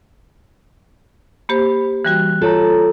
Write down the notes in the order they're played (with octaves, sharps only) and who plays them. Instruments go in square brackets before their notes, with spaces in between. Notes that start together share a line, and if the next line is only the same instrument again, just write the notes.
[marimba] A#3 G4 C5 [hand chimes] B5
[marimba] E3 G3 F#4 [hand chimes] F#6
[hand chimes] F4 C#5 A#5 [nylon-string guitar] A4